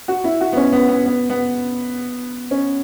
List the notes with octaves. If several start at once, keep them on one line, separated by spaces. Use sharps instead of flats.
F#4
E4
F#4
B3
C#4
B3
B3
B3
B3
C#4